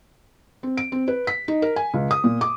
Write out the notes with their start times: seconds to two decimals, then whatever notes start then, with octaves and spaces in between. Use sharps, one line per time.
0.63 C4
0.77 D7
0.92 C4
1.08 B4
1.27 B6
1.48 D#4
1.62 A#4
1.76 G#5
1.94 C#2
2.11 D#6
2.24 A#2
2.41 D6